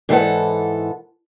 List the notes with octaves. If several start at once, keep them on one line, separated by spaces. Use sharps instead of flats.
G#2 E3 A4 F#5